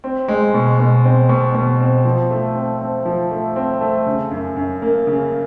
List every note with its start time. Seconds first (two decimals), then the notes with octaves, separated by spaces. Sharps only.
0.04 C4
0.28 G#3
0.54 B2
0.79 B2
1.04 C4
1.29 B2
1.55 B2
1.80 C4
2.05 F3
2.30 A3
2.55 C4
2.81 C4
3.05 F3
3.31 A3
3.56 C4
3.81 A3
4.06 C#3
4.31 F#2
4.56 F#2
4.82 A#3
5.07 C#3